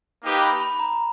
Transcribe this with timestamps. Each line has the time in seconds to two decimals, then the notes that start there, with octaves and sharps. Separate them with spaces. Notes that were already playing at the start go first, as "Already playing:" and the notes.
0.22 A#3 D#4 G4 B4
0.42 B5
0.60 B5
0.79 A#5